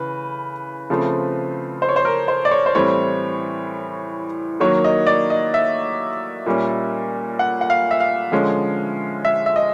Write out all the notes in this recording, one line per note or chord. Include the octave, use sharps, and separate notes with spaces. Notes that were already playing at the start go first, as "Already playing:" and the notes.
Already playing: C#3 E3 B4
C#3 F3 A3 C4
C5
C#5
C5
A#4
C5
D5
C#5
C5
A2 E3 G3 C4 C#5
D#3 F#3 A#3 C#5
D#5
D5
D#5
E5
A#2 G3 A#3 C#4
F#5
F#5
F5
E5
F5
D3 F3 G#3 C#4
E5
E5
D#5